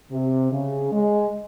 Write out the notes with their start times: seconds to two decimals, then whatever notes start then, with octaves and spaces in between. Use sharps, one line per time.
0.12 C3
0.53 C#3
0.92 G#3